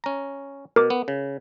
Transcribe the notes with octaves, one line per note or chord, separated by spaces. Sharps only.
C#4 A#5
B2 A#4 D6
B3
C#3